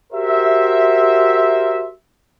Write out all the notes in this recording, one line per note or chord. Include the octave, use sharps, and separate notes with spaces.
F#4 G4 A#4 C5 E5